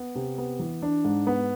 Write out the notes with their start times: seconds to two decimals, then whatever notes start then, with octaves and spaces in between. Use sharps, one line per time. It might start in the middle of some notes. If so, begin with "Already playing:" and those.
Already playing: B3
0.16 C3
0.38 B3
0.59 E3
0.82 D4
1.05 G#2
1.27 B3